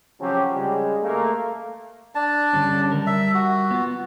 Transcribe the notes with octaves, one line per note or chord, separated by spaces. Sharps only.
C#3 F3 F#3 C4 C#4 G4
C#3 G3 G#3
A3 A#3
D4 A5
D3 G3 C#4
G3 A#4
E5
F#4
B3 F4